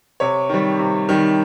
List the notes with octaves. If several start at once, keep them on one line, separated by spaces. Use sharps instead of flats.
C3 C#5
D#3 G3
C3
D#3 G3